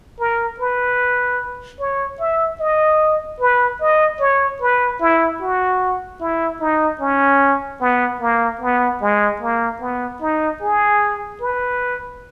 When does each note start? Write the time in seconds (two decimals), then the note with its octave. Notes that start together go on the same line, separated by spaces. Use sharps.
0.20 A#4
0.60 B4
1.80 C#5
2.20 E5
2.60 D#5
3.40 B4
3.81 D#5
4.20 C#5
4.61 B4
5.01 E4
5.41 F#4
6.20 E4
6.61 D#4
7.01 C#4
7.81 B3
8.21 A#3
8.61 B3
9.01 G#3
9.41 A#3
9.81 B3
10.21 D#4
10.61 G#4
11.41 B4